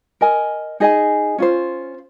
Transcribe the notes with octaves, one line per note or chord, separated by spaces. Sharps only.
A#4 D#5 G#5
D#4 G#4 D#5 G#5
C#4 F4 C5